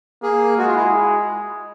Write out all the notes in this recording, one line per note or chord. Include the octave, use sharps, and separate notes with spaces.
A#3 G#4
G#3 F#4
F4
E4